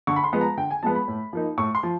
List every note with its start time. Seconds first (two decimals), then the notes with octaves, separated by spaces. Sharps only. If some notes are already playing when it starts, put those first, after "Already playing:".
0.07 D3 C#6
0.16 B5
0.24 C6
0.33 F3 G#3 B3
0.41 A#5
0.57 D3 G5
0.71 G#5
0.83 F3 G#3 B3 A5
0.95 B5
1.08 A2
1.33 F3 A#3 D#4
1.57 A2 C#6
1.75 C6
1.83 F3